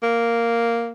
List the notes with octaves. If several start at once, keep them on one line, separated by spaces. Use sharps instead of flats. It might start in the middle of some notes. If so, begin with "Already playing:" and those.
A#3